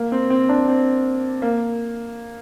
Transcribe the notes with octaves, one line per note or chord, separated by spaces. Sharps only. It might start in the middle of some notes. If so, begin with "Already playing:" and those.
Already playing: A#3
C4
C4
D4
C4
A#3